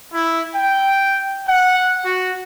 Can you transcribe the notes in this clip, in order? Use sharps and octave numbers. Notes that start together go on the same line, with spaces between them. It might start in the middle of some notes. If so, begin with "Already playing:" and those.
E4
G5
F#5
F#4